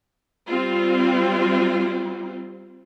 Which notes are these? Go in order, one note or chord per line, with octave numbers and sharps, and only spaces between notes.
G3 C4 F4